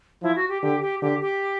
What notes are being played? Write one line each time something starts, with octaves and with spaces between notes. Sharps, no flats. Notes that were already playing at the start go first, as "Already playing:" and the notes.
F3 E4
F#4
G4
D3 G4
G4
D3 G4
G4